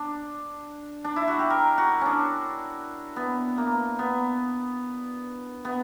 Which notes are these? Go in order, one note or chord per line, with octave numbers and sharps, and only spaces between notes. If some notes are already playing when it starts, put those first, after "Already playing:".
Already playing: D4
D4
E4
F#4
G4
A#4
F#4
C#4 D4
B3
A#3
B3
B3